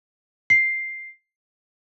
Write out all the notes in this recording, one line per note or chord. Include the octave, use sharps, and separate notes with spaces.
C7